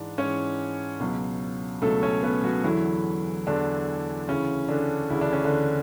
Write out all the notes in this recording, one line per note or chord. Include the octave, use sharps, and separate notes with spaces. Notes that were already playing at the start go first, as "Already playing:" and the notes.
Already playing: G#2 E3 D4
G#2 E3 C#4 C#5
C#2 B2 F#3
C#2 B2 F#3 A3 A4
C#4 C#5
B3 B4
F#3 F#4
E2 D3 E3 F#3 E4
E2 D3 F#3 D4
D2 C#3 E3 C#4
D3 D4
D2 C#3 E3 E4
D4
C#4
D3 D4